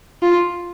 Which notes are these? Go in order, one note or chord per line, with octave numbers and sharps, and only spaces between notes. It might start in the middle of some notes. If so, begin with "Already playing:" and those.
F4